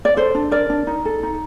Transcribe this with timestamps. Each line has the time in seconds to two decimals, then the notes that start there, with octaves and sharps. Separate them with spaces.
0.05 D5
0.17 A4 C5
0.35 D4
0.51 A#4 D5
0.70 D4
0.87 D#4
1.05 A4
1.23 D#4